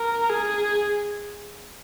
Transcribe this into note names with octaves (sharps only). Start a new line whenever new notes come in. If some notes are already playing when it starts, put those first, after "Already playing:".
Already playing: A#4
G#4